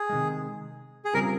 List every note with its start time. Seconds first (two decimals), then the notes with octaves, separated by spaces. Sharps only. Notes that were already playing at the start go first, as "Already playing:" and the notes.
Already playing: G#4
0.09 C3 D#3 G#3
1.05 G#4
1.14 C#3 G3 C4 F4 A#4